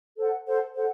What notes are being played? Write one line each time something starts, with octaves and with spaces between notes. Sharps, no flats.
A4 C5 F#5
A4 C5 F#5
A4 C5 F#5